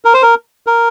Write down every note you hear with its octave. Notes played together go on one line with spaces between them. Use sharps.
A#4
C5
A#4
A#4